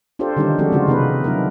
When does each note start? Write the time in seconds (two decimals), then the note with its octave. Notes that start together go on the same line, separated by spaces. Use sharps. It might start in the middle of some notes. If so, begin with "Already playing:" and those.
0.19 D4 F4 G4 A4 C5 D5
0.36 D3 D#3 G3 A#3 C#4 D#4
0.59 F3 G#3 C4 F#4 G4 A4
0.72 C#3 G#3 F4 F#4
0.88 C3 B3 D#4 B4
1.24 F#3 D4 E4 A#4